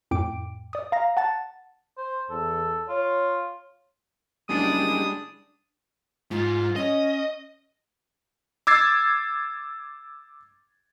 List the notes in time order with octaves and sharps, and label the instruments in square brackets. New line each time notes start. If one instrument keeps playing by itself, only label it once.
[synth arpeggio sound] F2 A2 G5 D6 D7
D5 D#6
F5 A#5 A#6
F#5 A5 A6
[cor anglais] C5
[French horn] E2 [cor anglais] A4
[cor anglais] F4 [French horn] C#5
[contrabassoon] F#1 [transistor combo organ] G3 G#3 [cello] D4 [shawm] D#6
[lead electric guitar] G#2 [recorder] F4
[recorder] C#4 [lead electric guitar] D#5
[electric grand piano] D6 E6 G#6 A6 C7